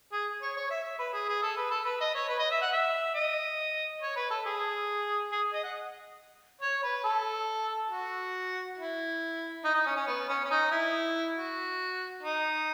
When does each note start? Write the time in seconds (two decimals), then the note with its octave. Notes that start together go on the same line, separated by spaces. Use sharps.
0.12 G#4
0.42 C#5
0.57 C#5
0.70 E5
0.84 E5
0.99 B4
1.13 G#4
1.29 G#4
1.43 A4
1.57 B4
1.71 A4
1.85 B4
2.01 D#5
2.15 C#5
2.29 B4
2.39 D#5
2.51 E5
2.61 F#5
2.72 E5
3.15 D#5
4.02 C#5
4.16 B4
4.30 A4
4.45 G#4
5.32 G#4
5.54 D#5
5.63 F#5
6.61 C#5
6.83 B4
7.04 A4
7.90 F#4
8.78 E4
9.64 D#4
9.74 D#4
9.86 C#4
9.96 C#4
10.07 B3
10.29 C#4
10.44 C#4
10.51 D#4
10.71 E4
11.36 F#4
12.23 D#4